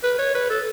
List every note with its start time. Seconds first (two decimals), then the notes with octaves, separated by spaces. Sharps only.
0.03 B4
0.19 C#5
0.35 B4
0.50 A4